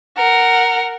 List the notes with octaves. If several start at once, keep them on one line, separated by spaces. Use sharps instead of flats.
A#4 F#5